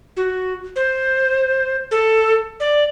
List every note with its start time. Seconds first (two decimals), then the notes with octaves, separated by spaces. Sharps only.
0.17 F#4
0.76 C5
1.91 A4
2.60 D5